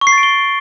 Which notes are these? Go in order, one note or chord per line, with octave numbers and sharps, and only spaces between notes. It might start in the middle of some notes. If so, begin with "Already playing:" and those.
C#6
C7
A6
D7
G7